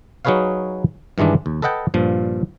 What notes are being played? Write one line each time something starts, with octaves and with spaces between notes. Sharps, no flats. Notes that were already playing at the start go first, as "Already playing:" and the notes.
F#3 D#4 G#4 B4 C#5 F5
G2 D#3 E3 G#3 D4
D#2
A4 B4 D#5 F#5 G5 A5
G2 A#2 F3